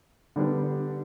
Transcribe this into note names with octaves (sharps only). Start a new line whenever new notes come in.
D3 G3 B3 D4